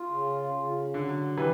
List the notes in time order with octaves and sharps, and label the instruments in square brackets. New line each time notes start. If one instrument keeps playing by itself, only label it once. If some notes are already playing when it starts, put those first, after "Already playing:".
Already playing: [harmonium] F4
C#3
C#3
[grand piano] D3 [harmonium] F#3
[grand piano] E3 [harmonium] G4